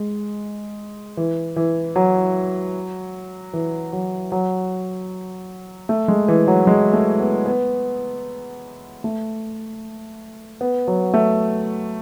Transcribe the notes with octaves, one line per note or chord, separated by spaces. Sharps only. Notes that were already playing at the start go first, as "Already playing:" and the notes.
Already playing: G#3
E3
E3
F#3
E3
F#3
F#3
A3
G#3
E3
F#3
G#3
A3
B3
B3
A3
B3
F#3
A3